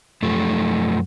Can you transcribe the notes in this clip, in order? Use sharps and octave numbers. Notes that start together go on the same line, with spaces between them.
F#2 F3 A3